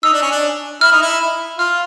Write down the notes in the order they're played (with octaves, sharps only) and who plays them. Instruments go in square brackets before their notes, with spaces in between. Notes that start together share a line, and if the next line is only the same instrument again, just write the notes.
[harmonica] D#4 [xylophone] E6
[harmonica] D4
C#4
D4
[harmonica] E4 [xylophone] F6
[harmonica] D#4
E4
[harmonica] F4 [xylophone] F6